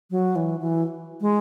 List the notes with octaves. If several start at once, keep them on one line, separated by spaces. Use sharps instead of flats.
F#3
E3
E3
G#3